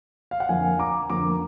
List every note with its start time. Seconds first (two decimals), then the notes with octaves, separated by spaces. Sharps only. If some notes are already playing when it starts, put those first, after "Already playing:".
0.31 F5
0.40 F#5
0.49 F2 D3 F3 A#3 F5 G#5
0.79 A#5 D6
1.10 F2 D3 F3 A#3 A#5 D6